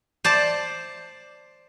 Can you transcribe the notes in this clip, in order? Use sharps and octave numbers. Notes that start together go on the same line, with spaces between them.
C5 D5 A5